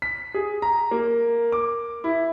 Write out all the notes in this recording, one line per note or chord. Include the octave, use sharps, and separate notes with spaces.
B6
G#4
A#5
A#3
D6
E4